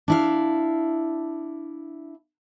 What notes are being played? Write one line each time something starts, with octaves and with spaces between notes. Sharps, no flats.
D4 E4 F5